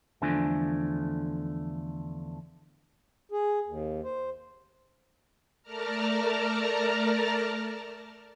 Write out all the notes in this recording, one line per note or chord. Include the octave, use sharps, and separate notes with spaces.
E2 D3 F3 A3 D4 G#5
G#4
D#2
C5
A3 A#4 D5 A5 A#5 F6